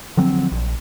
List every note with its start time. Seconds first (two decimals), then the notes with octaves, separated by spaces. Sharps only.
0.17 D3 F3 F#3 C4
0.52 A#1